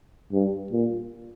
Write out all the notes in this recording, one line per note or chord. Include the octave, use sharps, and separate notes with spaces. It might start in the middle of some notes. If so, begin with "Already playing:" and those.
G2
A#2